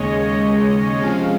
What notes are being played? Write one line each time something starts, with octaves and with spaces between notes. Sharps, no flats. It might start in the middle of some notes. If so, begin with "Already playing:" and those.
Already playing: D#2 C#3 G#3 C#5 D#5
D#5
C3 F3 G#3 C#4 F5